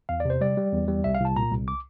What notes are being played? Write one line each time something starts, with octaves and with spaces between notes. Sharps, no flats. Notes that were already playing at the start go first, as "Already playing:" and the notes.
E2 F5
D5
C3 C5
G3 D5
G3
E2
G3
C2 E5
F5
C2 A5
A#2 A#5
C2
D6